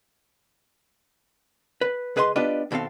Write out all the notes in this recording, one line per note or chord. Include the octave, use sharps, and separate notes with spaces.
B4
C#2 G#4 B4 D#5 A#5 C6
B3 D4 F4 G4 B4 D#5
D#2 B2 C4 A4 F5